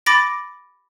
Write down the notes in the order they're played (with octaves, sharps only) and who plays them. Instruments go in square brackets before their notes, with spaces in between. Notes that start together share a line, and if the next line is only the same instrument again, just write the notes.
[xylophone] B5 D6 A6 A#6 D7